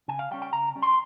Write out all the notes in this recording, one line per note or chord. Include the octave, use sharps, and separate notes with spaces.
C#3 G#5
F5
G3 C#4 G5
G5
C#3 A#5
G3 C#4
C6